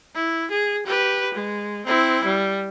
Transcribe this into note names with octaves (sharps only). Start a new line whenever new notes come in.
E4
G#4
G4 B4
G#3
C4 E4
G3